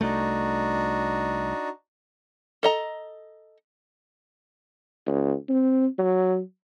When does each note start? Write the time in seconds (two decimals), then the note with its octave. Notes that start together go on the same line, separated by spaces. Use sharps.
0.01 C2 A3 D4 D#4 F#4
2.63 A4 D#5 A#5
5.07 C#2
5.49 C4
5.99 F#3